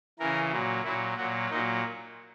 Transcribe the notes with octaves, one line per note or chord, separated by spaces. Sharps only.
C#3 E3 A#4
A#2 F#3
A#2 F#3 E4
A#2 F#3 F#4
A#2 F#3 D#4